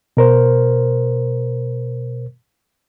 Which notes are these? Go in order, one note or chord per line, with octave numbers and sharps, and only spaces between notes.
B2 A#4 C5